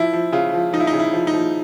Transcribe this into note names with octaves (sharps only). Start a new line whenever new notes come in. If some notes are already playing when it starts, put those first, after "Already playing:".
Already playing: F3 E4
F3
C#3 F4
F3
F3 D#4
E4
D#4
C#3
E4
F3
D#4
F3